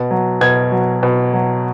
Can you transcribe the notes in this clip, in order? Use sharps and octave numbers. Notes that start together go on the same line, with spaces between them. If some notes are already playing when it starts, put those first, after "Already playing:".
Already playing: B2
F#3
B2 G#6
F#3
B2
F#3